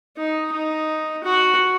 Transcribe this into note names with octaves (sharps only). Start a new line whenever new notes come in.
D#4
D#4
F#4